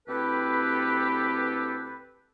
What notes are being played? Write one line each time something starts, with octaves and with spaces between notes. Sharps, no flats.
D2 C4 E4 G4 A4 B4